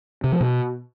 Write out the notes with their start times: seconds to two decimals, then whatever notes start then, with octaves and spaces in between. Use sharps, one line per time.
0.24 C3
0.32 F3
0.41 B2